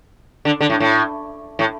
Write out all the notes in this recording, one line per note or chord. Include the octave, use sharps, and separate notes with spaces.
D3
D3
A2
A2
A2